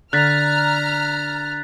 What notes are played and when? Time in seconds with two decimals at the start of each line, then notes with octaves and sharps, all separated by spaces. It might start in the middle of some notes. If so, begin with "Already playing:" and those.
0.13 D3 A#5 F6 F#6 A6 B6